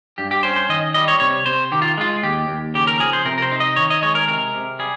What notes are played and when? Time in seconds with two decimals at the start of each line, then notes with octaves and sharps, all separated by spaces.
0.18 G2 G4
0.31 G4
0.43 C#4 C5
0.56 C5
0.69 D#3 D#5
0.94 G3 D#5
1.08 C#5
1.20 C3 C#5
1.46 C3 C5
1.72 D#3 G4
1.82 F4
1.98 G#3 F4
2.23 D#2 G4
2.48 D#2
2.74 C#3 G4
2.87 A#4
3.00 F3 G#4
3.13 C5
3.25 C3 A#4
3.38 A#4
3.42 C5
3.52 D#4
3.60 D#5
3.76 D#3 C#5
3.90 D#5
4.02 G#3 C#5
4.15 A#4
4.28 C3 A#4
4.54 C3
4.79 G3 G#4